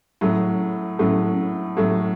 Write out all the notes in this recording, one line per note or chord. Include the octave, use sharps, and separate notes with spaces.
A2 F#3 A3
A2 F#3 A3
A2 F#3 A3